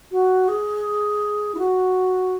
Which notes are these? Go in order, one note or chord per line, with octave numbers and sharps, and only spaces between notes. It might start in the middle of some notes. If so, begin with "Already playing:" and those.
F#4
G#4
E4
F#4